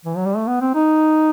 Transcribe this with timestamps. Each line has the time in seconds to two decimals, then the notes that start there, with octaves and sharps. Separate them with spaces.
0.05 E3
0.17 F#3
0.26 G3
0.36 A3
0.47 B3
0.61 C4
0.75 D#4